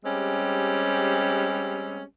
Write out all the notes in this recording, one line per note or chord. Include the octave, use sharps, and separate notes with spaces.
G3 G#3 C4 C#4 G4